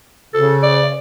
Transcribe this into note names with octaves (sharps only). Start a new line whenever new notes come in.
C#3 A4
D5